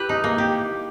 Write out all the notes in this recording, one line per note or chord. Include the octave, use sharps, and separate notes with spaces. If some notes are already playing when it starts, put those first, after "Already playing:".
Already playing: E4 G4 B4
D#4
A#3
G4